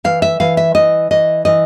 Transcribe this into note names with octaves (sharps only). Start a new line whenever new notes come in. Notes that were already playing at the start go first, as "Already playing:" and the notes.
E3 F5
E5
E3 F5
E5
E3 D#5
E3 D#5
E3 D#5